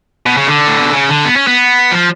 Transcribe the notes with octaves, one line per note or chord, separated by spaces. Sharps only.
B2
C#3
D3
A2
B2
C#3
D3
B3
C#4
B3
F3